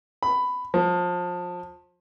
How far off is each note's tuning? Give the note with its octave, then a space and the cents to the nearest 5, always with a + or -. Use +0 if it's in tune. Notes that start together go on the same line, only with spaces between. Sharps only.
B5 +10
F3 +25